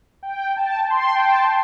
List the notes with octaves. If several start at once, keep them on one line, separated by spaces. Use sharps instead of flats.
G5
A5
C6
G5
A5